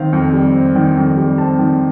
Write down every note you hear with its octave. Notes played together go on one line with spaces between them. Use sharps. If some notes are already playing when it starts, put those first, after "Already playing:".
Already playing: D#3 C4 F5
F2
G3
C4
D#3
F2
G3
C4 A5
D#3